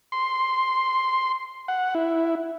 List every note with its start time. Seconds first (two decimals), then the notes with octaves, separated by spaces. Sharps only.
0.12 C6
1.68 F#5
1.95 E4